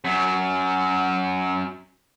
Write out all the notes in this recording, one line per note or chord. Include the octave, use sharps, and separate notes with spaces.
F#2 F#3